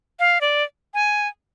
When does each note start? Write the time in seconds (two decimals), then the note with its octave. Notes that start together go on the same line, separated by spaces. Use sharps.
0.19 F5
0.41 D5
0.94 G#5